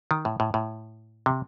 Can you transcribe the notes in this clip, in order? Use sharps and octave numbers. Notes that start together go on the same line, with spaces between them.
D#3
A2
A2
A2
C3